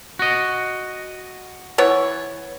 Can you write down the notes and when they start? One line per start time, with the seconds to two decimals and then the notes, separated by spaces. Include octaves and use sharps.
0.19 F#4 D#5
1.78 E3 B3 C#5